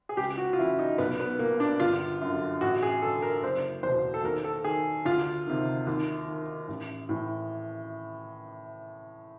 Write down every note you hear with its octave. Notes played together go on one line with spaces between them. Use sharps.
G#4
C#2 G4
F#4
F4
C#3 E3 E4
D#4
B1 B3
B3
A#2 A#3
D4
G1 F4
F#2 D3
A1 F#4
G#4
G2 D3 A4
A#4
F#1 C5
E2 C5
B2
A4
D#2 A#4
A4
D#3 G#4
D2 F4
C3 D#3
D#2
D#3
A1
A2 E3